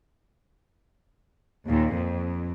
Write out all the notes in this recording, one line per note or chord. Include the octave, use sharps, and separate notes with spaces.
D#2 A#2
F2